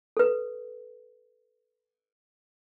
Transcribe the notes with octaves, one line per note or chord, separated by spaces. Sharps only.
A4 B4